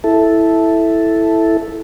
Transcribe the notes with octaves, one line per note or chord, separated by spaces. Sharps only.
E4 A4